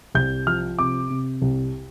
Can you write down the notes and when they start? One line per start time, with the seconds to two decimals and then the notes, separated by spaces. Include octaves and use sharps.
0.15 C2 G6
0.47 F3 F6
0.79 C3 D6
1.10 C3
1.42 C2